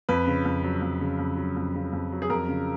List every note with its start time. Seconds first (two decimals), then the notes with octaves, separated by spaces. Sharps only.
0.09 F2 B4
0.27 C#3
0.45 F2
0.64 F#3
0.82 F2
1.01 C#3
1.19 F2
1.37 F#3
1.57 F2
1.75 C#3
1.93 F2
2.12 F#3
2.22 G#4
2.30 F2 A#4
2.49 C#3